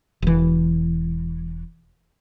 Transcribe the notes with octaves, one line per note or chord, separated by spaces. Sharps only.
E1 E3